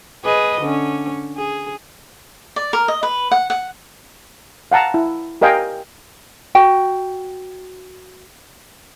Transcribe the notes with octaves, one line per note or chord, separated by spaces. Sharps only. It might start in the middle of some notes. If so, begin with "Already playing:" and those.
G#4 B4 D#5
D3 C#4
G#4
D5
A#4
D#5
B4
F#5
F#5
F5 F#5 A5 A#5
E4
G4 A#4 D#5 F5 G5 G#5
F#4 G5